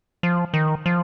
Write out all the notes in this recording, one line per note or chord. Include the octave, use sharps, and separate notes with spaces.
F3
D#3
F3